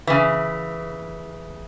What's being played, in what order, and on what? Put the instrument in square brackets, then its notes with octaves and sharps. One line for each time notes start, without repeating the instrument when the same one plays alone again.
[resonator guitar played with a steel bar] C#3 E3